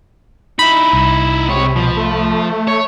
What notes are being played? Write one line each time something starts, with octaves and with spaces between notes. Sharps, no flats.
D#4 E4 B5
C2
C3 G#3 C#5
B2 F3
A3
C#5